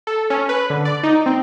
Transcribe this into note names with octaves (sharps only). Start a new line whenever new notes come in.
A4
C#4
B4
D3
D5
D#4
C4